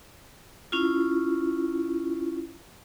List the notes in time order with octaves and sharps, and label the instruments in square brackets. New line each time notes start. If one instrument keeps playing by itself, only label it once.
[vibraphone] C#4 E4 F4